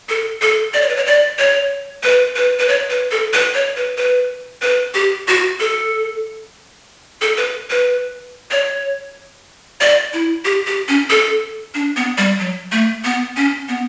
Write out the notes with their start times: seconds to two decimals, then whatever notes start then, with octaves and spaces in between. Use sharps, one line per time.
0.09 A4
0.42 A4
0.74 D5
0.82 C#5
0.89 B4
0.96 C#5
1.07 D5
1.39 C#5
2.03 B4
2.36 B4
2.59 B4
2.68 C#5
2.90 B4
3.11 A4
3.33 B4
3.54 C#5
3.76 B4
3.98 B4
4.62 B4
4.94 G4
5.28 F#4
5.60 A4
7.21 A4
7.37 B4
7.70 B4
8.51 C#5
9.81 D5
10.13 E4
10.45 G4
10.67 G4
10.88 C#4
11.10 A4
11.74 D4
11.96 B3
12.18 G3
12.39 F#3
12.72 A3
13.04 B3
13.36 C#4
13.69 B3